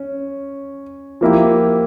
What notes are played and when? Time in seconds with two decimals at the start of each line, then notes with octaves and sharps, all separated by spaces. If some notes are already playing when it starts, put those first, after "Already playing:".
Already playing: C#4
1.21 F3 A#3 E4 G4